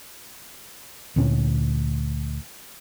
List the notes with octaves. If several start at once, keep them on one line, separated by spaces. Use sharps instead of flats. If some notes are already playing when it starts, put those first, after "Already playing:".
D2 A#2 C#4